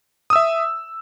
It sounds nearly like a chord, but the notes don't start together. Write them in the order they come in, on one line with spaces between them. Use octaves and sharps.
D#6 E6 E5